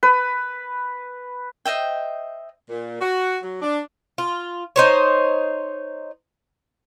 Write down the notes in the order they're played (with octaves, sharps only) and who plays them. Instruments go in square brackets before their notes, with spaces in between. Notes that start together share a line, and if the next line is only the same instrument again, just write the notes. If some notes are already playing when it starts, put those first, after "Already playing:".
[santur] B4
[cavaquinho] C5 D#5 E5 G5
[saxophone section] A#2
F#4
F#3
D4
[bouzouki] F4
D#4 C5 C#5